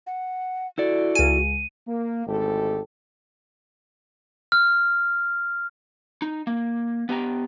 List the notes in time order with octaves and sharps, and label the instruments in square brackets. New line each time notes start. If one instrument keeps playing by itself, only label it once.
[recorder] F#5
[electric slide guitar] E4 A4 D5 [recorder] F#4
[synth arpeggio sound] C#2 G#5 [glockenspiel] D#7
[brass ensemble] A#3
G#1 D2 G#3 G4 A4
[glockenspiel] F6
[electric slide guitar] D#4
A#3
B3 G4 G#5 A#5